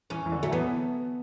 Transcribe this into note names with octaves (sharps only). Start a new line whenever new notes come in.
E3 C#4
E3
D3
F#3 A3
E3 B3